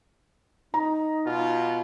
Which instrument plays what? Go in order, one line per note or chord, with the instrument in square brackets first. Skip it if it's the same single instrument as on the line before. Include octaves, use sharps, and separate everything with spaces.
[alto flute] D#4 [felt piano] A#5
[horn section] B2 F4